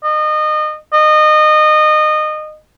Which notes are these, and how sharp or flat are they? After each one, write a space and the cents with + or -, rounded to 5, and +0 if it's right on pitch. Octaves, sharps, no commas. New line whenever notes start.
D#5 -30
D#5 -25